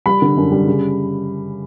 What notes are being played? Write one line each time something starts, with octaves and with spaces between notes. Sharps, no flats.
G3 B5
D3
F#2
G3
C#3